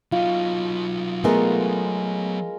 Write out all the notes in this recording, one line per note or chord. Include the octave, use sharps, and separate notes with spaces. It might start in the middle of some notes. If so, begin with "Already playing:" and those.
F#3 D#4 F4
G#3 A3 B3 F4 A#4